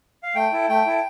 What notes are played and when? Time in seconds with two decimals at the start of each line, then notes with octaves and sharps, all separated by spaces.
0.23 F5
0.35 A3 G5
0.52 E4 A4
0.69 A3 G5
0.86 E4 A4